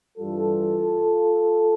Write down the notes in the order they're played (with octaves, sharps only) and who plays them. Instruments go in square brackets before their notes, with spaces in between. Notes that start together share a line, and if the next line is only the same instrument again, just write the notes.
[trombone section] G2 E3 G3 F4 A4